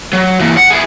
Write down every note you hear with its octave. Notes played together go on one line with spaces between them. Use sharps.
F#3
E3 A#3
F#5
E4 G#4